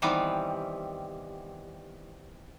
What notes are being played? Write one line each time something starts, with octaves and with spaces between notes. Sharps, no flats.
D#3 E3 G3 B3 C4